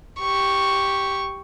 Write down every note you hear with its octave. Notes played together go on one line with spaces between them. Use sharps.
G4 C#6